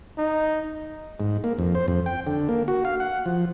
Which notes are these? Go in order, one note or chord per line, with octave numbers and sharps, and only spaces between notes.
D#4
G#2
A#3
F2
C5
F2
G5
D3
A#3
F#4
F5
F#5
F3